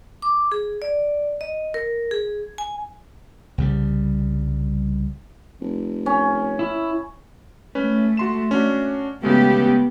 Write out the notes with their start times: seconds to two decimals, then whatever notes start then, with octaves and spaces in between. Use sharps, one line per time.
0.22 D6
0.52 G#4
0.82 D5
1.41 D#5
1.74 A#4
2.11 G#4
2.58 G#5
3.58 C2 C#3 G3
5.61 F1
6.06 C#4
6.59 E4
7.75 A3 C#4 B4
8.17 F#4 C6 E7
8.51 C#4 D4 F#4
9.23 C#3 G#3 A3 B3 G4